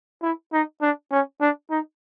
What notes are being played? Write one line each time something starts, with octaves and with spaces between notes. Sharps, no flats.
E4
D#4
D4
C#4
D4
D#4